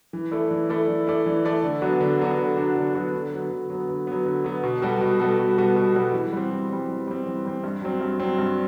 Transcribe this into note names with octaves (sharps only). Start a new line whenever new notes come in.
E3
A3 E4 A4 D5
E3
A3 E4 A4 D5
E3
A3 E4 A4 D5
E3
A3 E4 A4 D5
D3
F#3 B3 D4 F#4
D3
F#3 B3 D4 F#4
D3
F#3 B3 D4 F#4
D3
F#3 B3 D4 F#4
D3
F#3 B3
D3
F#3 B3
D3
F#3 B3
D3
F#3 B3
B2
G3 B3 F#4 A4
B2
G3 B3 F#4 A4
B2
G3 B3 F#4 A4
B2
G3 B3 F#4 A4
E3
G3 C4
E3
G3 C4
E3
G3 C4
E3
G3 C4
G2
F#3 C4
G2
F#3 C4
G2